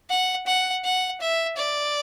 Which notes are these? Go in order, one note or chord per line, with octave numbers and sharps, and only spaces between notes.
F#5
F#5
F#5
E5
D5